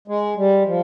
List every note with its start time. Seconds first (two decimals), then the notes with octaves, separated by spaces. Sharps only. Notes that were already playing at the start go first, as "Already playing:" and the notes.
0.08 G#3
0.37 G3
0.66 F3